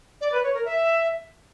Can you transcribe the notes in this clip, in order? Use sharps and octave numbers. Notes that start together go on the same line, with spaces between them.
D5
B4
C#5
A#4
E5